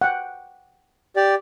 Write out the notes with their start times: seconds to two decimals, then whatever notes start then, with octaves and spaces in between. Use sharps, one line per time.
0.01 F#5 G5
1.16 G4 D5